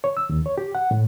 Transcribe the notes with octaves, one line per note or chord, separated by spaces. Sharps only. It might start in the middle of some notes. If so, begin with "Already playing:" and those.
C#5
E6
D#2
C#5
G4
F#5
A2